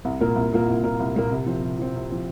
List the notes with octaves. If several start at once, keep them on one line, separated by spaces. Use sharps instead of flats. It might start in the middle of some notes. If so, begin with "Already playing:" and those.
C2
A#2 A#3 F4 A#4
C2
A#2 A#3 F4 A#4
C2
A#2 A#3 F4 A#4
C2
A#2 A#3 F4 A#4
C3
F3 C4
C3
F3 C4
C3
F3 C4